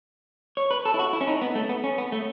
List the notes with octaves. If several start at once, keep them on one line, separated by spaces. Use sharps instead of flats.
C#5
B4
A4
E4
F#4
E4
C#4
D#4
B3
A3
B3
C#4
B3
A3